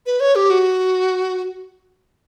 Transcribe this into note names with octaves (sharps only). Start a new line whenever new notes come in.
B4
C#5
G4
F#4